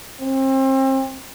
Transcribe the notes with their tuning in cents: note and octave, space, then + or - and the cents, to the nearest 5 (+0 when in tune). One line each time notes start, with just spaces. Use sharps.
C4 +35